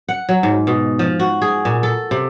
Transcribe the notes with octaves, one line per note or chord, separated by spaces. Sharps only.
F#5
F#3
G#2
B2
F3
F#4
G#4
A#2
A4
C3